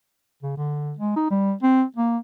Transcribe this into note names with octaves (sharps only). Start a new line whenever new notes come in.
C#3
D3
G#3
D#4
G3
C4
A#3